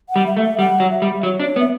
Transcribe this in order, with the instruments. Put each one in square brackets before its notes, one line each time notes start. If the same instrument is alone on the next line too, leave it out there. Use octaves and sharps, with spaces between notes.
[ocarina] F#5
[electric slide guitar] G3
[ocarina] E5
[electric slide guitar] A3
[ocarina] E5
[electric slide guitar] G3 [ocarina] F#5
[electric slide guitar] F#3
[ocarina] E5
[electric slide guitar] G3
[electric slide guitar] F#3 [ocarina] C#5
[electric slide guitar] D4
[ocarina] C#5
[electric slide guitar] B3
[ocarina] E5